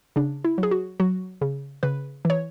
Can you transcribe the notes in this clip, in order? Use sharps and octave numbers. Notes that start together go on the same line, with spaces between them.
C#3 D4
E4
F#3
G#4
F#4
F#3 F#4
C#3
C#3 B4
E3 C#5